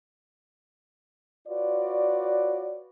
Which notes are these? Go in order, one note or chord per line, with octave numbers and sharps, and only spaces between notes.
F4 F#4 B4 C#5 D5